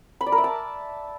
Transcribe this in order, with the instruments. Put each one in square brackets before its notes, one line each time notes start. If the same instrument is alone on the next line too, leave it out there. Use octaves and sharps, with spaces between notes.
[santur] B5
D5
A#4
E5
A5